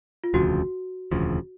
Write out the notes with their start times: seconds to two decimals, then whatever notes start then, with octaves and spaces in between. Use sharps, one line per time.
0.24 F4
0.34 E1 D2 C#3 F3 F#4
1.12 E1 D2 C#3 F3